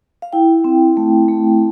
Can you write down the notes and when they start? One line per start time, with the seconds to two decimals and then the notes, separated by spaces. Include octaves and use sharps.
0.22 F5
0.33 E4 G5
0.64 C4
0.97 A3
1.28 A3